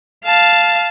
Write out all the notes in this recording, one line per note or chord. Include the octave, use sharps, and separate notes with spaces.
F5 A5